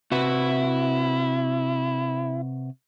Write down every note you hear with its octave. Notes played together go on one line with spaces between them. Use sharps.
C3 E4 F#4 B4